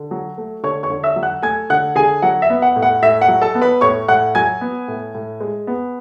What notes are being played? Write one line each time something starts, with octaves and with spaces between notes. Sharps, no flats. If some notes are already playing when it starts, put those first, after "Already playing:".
Already playing: D3
F#3
A3
D3 C#5 C#6
C#5 C#6
D3
E5 E6
F#3
F#5 F#6
A3 G#5 G#6
D3 F#5 F#6
D3 G#4 G#5
F#3 F#5
E5
B3
F#5
A2
F#5
A2 E5
F#5
F#3
A4 A5
B3
B4 B5
A2 C#5 C#6
A2 F#5 F#6
F#3 G#5 G#6
B3
A2
A2
G#3
B3